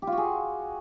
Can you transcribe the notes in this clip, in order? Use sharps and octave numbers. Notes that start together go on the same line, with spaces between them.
G4
F4
F#4
G#4